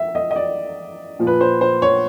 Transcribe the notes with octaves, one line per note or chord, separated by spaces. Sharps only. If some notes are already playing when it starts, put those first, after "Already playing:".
Already playing: E5
D#5
D#5
D5
A#2 F3
B4
C5
C5
C#5